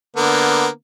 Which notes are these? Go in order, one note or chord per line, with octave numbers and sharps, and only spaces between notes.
D3 A#3 B3